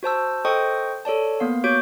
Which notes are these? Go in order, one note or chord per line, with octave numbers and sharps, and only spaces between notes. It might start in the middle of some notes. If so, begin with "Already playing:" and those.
F#4 C5 A5 E6
A4 C5 D#5 G5 C#6 D#6
A4 C#5 D5 A5
A#3 B3 F5
F#4 C#5 D6 G6 D7